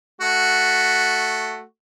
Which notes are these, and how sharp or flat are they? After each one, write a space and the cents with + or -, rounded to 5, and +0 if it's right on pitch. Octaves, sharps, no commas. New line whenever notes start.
A3 +0 F#4 +0